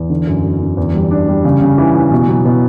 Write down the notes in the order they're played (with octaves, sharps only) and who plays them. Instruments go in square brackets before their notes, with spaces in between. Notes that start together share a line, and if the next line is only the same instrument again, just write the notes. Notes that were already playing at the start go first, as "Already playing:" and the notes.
Already playing: [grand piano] E2
D3
F#2
F#2
D3
E2
G3
D4
G3
C#3
C#3
E3
E3
B2
F#3
B2